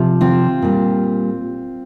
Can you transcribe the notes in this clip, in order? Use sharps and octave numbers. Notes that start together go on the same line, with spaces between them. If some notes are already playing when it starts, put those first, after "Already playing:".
Already playing: C3 F3
C4 F4
A#2 G3